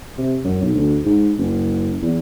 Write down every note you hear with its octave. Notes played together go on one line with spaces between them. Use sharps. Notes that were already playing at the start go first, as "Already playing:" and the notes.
C3
F#2
B1
D2
G#2
F#1
E2